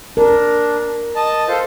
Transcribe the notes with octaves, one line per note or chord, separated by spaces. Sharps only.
D4 A#4
D#5 A5
F4 A4 C5